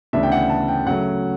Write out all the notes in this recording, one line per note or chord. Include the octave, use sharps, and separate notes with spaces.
D2 C#3 E3 B3 D4 E5
G5
F#5
A5
G5
C#3 F#3 A3 F#5